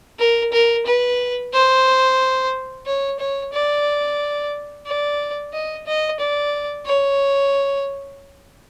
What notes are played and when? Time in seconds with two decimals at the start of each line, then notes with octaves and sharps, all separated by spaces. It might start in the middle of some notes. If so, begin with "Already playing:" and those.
0.19 A#4
0.53 A#4
0.86 B4
1.53 C5
2.86 C#5
3.19 C#5
3.53 D5
4.86 D5
5.53 D#5
5.87 D#5
6.20 D5
6.86 C#5